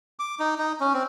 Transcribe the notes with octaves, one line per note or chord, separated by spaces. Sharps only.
D6
D#4
D#4
C#4
C4